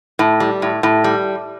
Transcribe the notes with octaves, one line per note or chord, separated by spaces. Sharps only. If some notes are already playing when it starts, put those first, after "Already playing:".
A2
G3
A2
A2
G3